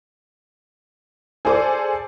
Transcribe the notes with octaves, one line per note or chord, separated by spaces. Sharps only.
G#4 A4 C5 D5